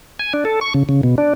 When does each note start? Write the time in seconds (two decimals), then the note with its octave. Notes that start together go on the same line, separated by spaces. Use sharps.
0.19 G#5
0.34 D4
0.45 A4
0.61 C#6
0.74 C#3
0.89 C#3
1.03 B2
1.18 D4